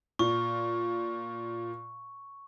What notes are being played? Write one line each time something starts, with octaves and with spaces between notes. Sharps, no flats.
A#2 C#6